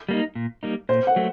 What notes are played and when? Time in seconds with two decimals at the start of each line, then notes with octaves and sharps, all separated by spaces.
0.09 G3 A#3 D#4
0.35 A#2
0.63 G3 A#3 D#4
0.89 A#2 C5
1.07 F#5
1.16 F#3 A3